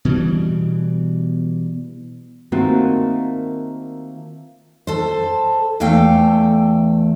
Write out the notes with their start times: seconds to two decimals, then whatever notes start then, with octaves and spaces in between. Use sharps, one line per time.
0.05 B2 E3 G3
2.52 D#3 A3 A#3 C4 F4 F#4
4.87 A4 C5
5.80 E2 E3 A3 A4 F5 G5